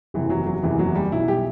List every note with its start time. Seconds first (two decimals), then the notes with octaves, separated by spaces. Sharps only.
0.14 F#1 E2 C3 E3
0.30 F#3
0.47 F#3
0.63 F#1 E2 C3 E3
0.79 F#3
0.95 G3
1.12 B1 B2 E4
1.28 G4